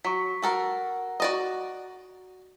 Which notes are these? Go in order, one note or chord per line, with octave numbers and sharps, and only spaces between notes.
F#3 C#6 B6
F#4 A4 A#4 F#5 A#5
F#4 D5 D#5